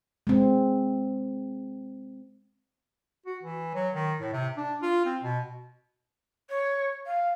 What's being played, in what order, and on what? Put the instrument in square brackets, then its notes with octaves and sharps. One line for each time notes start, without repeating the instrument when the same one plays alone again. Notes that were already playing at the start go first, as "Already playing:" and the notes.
[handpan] G#3 C4
[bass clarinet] F#4
E3
F#3
D#3
A2
C3
D4
F4
C4
B2
[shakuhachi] C#5
F5